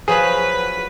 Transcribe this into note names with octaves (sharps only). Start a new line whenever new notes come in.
F3 F#3 F#4 G#4 B4